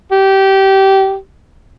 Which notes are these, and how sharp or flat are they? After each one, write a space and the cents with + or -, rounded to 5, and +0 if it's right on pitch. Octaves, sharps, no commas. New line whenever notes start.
G4 -20